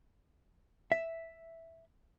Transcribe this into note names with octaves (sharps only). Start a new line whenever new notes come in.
E5